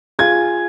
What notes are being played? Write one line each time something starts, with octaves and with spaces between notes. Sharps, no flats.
F4 G#4 G#6